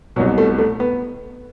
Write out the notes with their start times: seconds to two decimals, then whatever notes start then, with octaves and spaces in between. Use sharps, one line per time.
0.16 B2 F#3
0.20 C2
0.38 A3
0.58 A3
0.80 B3